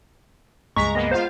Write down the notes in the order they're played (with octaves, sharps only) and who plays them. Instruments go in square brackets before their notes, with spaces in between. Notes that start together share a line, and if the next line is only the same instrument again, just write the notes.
[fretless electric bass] C#2 G2 [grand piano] G#3 B6 [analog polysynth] A#5 [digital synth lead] C#6
[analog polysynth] A#3 B3 [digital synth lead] D#5
[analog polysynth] F4 F5 [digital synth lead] C5